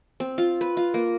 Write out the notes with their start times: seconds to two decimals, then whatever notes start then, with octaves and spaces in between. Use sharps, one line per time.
0.20 C4
0.38 F4
0.61 B4
0.77 F4
0.94 A#3